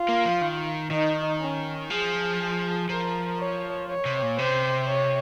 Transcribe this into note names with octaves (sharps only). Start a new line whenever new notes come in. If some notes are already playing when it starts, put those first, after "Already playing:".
Already playing: F4
A#3
F3
D#3
D#3 D#4
C#4
F3 G#4
G#4
F3 A#4
C#5
C#5
C3
A#2
C3 C5
C#5